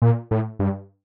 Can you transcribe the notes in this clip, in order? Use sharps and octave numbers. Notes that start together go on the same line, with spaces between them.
A#2
A2
G2